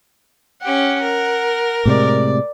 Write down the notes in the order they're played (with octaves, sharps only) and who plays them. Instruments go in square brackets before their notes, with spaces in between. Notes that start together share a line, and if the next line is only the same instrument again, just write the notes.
[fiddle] C#4 G4 [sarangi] F#5
[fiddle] A#4
[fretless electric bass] A2 C3 G#3 [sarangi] D5